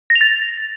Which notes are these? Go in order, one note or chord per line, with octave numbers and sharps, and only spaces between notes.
A#6
F7
A6